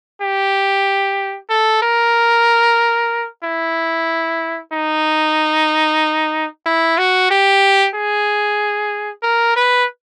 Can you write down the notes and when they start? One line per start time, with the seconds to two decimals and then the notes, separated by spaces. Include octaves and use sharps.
0.22 G4
1.50 A4
1.83 A#4
3.44 E4
4.73 D#4
6.66 E4
6.98 F#4
7.31 G4
7.95 G#4
9.23 A#4
9.56 B4